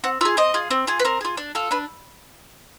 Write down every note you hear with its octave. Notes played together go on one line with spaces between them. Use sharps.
C4 F#5
F4 G#4 E5
C4 D#5
F4 G#4
C4
F4 G#4
B4
C4 A#4
F4 G#4
D4
F4 A4
D4 B4